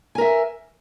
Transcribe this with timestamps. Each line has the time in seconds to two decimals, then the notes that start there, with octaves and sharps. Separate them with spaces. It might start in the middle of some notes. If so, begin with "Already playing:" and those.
0.15 G#5
0.18 A#4
0.21 E5